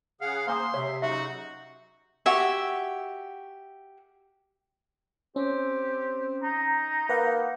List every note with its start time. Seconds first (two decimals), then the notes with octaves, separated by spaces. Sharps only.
0.21 C#3 G#4 F5 F#5
0.48 A#3 C5 F5 G#5 C6 D#6
0.74 C3 C#5 E5
1.02 C#3 F#3 D#4 F#4 E5
2.26 F#4 G4 E5 G#5
5.36 C4 C#4 G4
6.43 D#4 A#5
7.09 A#3 B4 F5 F#5